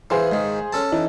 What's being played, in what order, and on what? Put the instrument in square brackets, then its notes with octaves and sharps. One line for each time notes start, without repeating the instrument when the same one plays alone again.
[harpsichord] E3 [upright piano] G#4 C5 F5
[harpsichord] G#2 D#3
C#4 A4 A5
[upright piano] E3 D#4